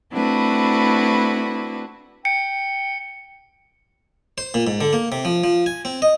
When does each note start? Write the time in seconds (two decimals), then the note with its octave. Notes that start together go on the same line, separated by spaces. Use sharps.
0.11 A3 C4 D4 E4 F#4 B4
2.25 G5 C#7
4.38 C5
4.54 A#2
4.67 G#2
4.81 D3
4.93 A#3
5.12 C3
5.25 F3
5.44 F3
5.66 G#5
5.85 C4
6.02 D#5